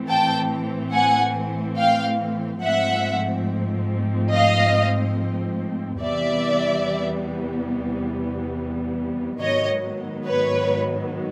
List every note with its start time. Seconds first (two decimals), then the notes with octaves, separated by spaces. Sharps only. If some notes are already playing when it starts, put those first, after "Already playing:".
Already playing: A2 E3 A3 C4
0.08 G5 A5
0.93 F#5 G#5
1.77 F5 G5
2.62 G#2 F3 A3 C4 E5 F#5
4.32 D#5 F5
6.01 E2 C3 E3 G3 B3 D5 E5
9.41 G#2 D#3 F#3 B3 C#5 D#5
10.26 B4 C#5